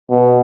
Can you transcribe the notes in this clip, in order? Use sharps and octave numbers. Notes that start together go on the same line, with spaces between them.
B2